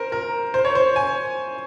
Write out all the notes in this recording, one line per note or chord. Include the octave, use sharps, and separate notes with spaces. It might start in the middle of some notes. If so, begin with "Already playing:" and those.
Already playing: A#4 C5
A#4
C5
C#5
C5
G#5